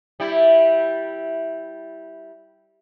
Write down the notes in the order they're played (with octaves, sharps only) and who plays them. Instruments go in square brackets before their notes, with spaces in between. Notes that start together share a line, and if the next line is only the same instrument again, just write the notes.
[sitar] G3 E4